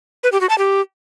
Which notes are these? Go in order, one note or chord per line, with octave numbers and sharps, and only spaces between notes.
B4
G4
F#4
A5
G4